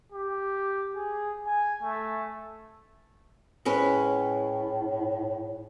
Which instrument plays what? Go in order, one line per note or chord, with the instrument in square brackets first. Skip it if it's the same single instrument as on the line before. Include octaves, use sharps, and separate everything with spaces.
[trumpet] G4
G#4
G#5
A3
[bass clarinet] A2 [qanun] G#3 C#4 B4